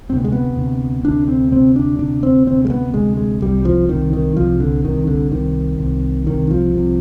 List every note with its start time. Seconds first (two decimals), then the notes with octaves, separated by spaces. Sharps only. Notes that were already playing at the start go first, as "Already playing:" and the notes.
0.09 D2 C4
0.12 C3 B3
0.24 G#3
0.32 B3
0.57 D2 C3
1.04 D2 C3 D4
1.28 C4
1.52 D2 C3 C4
1.76 D4
1.99 D2 C3 D4
2.23 C4
2.47 D2 C3 C4
2.65 G#3
2.70 B3
2.94 D2 C3 G#3
3.17 G#3
3.42 C2 C3 G3
3.65 F3
3.89 C2 C3 D#3
4.13 D#3
4.36 C2 C3 F3
4.60 D3
4.84 C2 C3 D#3
5.07 D3
5.31 C2 C3 D#3
5.79 C2 C3
6.26 C2 C3 D#3
6.51 F3
6.74 C2 C3